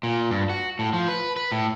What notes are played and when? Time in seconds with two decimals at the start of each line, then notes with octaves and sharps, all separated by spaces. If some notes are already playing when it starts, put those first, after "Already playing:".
0.03 A#2
0.31 G2
0.49 F#4
0.79 A2
0.93 F3
1.08 B4
1.36 B4
1.52 A2